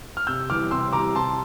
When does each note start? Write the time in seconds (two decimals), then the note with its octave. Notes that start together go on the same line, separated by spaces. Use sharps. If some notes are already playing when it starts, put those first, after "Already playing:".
0.17 F6
0.27 C3 E6 G6
0.50 E3 G3 D6 F6
0.71 C3 C6 E6
0.93 E3 G3 A#5 D6
1.15 C3 A5 C6